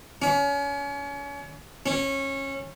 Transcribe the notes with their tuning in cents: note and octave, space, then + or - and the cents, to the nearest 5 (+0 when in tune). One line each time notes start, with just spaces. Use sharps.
C#4 +35
C#4 -20